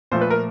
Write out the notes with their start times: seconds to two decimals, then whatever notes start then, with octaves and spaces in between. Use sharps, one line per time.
0.11 A#2 F3 A3 C5
0.21 B4
0.30 A#4